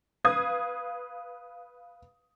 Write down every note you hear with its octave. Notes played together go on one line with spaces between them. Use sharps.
B4 F5 D#6 G#6